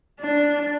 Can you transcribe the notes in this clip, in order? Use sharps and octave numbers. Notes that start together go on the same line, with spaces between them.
D4